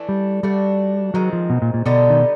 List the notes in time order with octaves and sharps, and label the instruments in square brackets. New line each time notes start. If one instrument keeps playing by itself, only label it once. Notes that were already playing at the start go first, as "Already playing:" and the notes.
Already playing: [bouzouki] E3 A3 D4
[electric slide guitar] G3
[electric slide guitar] G3 [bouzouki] A3 D4 F#4
[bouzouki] D#3 G#3 C4 [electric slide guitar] F#3
[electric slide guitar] F3
B2
A#2
A#2
[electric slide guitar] B2 [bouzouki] D3 G3 B3 D#4
[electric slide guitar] D#3